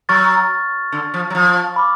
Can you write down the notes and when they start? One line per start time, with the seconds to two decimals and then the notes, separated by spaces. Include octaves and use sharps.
0.09 F#3 C#6 F6 A6
0.92 D3
1.14 F3
1.30 F#3
1.35 F3
1.76 B5 D6 F6